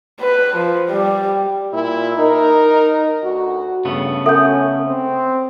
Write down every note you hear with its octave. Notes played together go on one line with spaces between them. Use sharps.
B4
F3
G3
A#2 E4
D#4 A#4
D2 F#4
G2 C#3 A3 B3
C#4 A4 E5 F#5 G6
C4